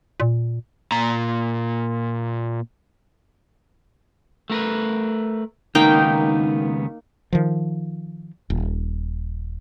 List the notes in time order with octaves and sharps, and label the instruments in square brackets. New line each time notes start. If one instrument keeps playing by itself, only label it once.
[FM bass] A#2
[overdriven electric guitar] A#2 A#5
[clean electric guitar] A3 A#4 B4
[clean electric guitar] C#2 D#3 B3 [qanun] A#3 D#4 G5
[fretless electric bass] D#3 F3
D#1